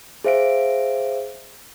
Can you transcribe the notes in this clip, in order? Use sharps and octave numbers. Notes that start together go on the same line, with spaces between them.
G#4 C5 E5 F5 D7